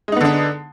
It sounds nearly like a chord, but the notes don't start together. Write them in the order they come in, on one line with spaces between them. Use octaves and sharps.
G#3 D#4 B3 D3 D4